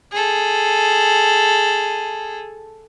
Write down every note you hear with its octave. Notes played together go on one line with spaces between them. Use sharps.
G#4 A4